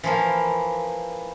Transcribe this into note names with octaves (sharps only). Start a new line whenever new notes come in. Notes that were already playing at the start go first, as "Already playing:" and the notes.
E3 F3 A#3